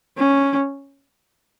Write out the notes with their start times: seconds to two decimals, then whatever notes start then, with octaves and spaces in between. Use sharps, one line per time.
0.18 C#4